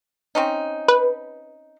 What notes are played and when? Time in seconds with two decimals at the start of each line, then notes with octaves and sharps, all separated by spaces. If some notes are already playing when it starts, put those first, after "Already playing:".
0.35 C4 C#4 D#4
0.88 B4